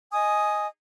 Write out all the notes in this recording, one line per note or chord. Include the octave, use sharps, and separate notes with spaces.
D#5 G#5 D#6